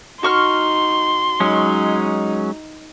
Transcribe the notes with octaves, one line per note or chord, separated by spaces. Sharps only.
D#4 F#4 C6 C#6 F6
F#3 G#3 C#4 D#4